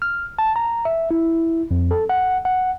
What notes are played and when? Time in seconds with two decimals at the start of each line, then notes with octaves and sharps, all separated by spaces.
0.02 F6
0.39 A5
0.56 A#5
0.85 E5
1.11 E4
1.71 F2
1.91 A4
2.09 F#5
2.45 F#5